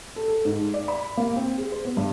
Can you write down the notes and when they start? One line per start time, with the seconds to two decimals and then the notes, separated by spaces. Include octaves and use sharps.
0.16 A4
0.28 A4
0.45 G#2
0.74 D5
0.88 B5
1.17 A#3
1.36 C4
1.58 G#4
1.72 C5
1.85 B3
1.97 G2